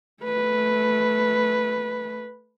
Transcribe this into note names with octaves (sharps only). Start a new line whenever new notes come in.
A3 B4